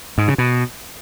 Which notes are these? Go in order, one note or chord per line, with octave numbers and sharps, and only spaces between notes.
G#2
C#3
B2